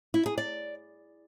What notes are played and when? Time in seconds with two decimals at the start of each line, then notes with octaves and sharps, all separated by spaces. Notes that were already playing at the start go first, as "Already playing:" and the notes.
0.14 E4
0.26 G#4
0.38 D5